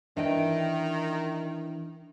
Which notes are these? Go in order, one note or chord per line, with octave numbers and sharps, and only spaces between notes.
D#3 E3 D4 D#5 G5